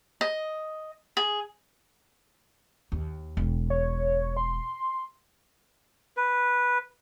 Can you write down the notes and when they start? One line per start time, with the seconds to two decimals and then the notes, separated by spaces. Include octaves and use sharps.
0.21 D#5
1.17 G#4
2.92 D#2
3.37 E1
3.70 C#5
4.37 C6
6.17 B4